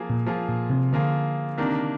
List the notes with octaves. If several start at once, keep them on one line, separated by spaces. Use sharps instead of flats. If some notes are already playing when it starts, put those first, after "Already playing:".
Already playing: F3 A#3 F4 G#4
A#2
F3 A#3 F4 G#4
A#2
C3
D3 F3 A#3 F4 G#4
C3 D#3 A#3 D4